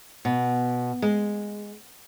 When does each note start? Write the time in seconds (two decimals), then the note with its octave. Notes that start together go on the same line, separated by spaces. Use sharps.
0.25 B2
1.02 G#3